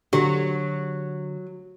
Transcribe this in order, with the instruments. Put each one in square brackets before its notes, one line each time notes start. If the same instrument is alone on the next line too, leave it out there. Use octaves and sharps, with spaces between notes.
[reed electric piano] D3 [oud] F#3 [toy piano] G4